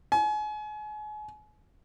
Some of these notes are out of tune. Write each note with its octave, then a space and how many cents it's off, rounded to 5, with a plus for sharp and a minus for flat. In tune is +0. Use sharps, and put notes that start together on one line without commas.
G#5 +35